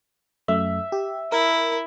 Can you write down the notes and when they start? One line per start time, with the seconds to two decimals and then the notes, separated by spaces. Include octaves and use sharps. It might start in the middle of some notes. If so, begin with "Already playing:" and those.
0.48 F#2 A3 E5
0.92 G4
1.32 E4 A#4